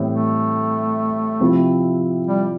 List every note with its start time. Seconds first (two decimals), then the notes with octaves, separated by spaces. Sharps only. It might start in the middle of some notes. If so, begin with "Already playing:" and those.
Already playing: A2 E3 G3 C4
0.10 A3
1.40 C3 F3 C4 E4
2.27 G3